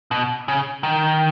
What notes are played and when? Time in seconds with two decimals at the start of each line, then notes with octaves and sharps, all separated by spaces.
0.11 B2
0.48 C#3
0.83 D#3